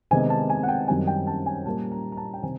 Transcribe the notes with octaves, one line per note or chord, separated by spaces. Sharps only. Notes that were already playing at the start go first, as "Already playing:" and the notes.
C3 D#3 G#3 B3 G#5
A5
G#5
F#5
G5
F#2 D#3 G3 C4 G#5
G5
A5
G#5
A#2 G3 A#3 A5
A#5
A#5
A5
G5
C3 D#3 G#5